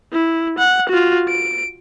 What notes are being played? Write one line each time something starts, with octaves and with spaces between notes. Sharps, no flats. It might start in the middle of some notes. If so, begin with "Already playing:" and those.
E4
F#5
F4 F#4
D7